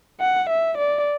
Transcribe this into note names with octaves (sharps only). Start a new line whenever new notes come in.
F#5
E5
D5